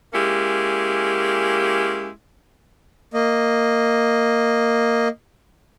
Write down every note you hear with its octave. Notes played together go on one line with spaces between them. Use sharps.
G#3 A#3 C#4 E4 G4
A#3 D#5